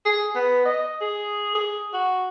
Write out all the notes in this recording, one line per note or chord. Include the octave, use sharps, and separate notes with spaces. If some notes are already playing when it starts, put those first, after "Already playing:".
G#4
B3
D#5
G#4
G#4
F#4